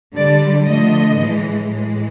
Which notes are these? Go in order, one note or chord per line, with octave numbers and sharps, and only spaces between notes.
D3 G3 D5
D3 F3 A3 D#5
A2 E3 G#3
A2 E3 G#3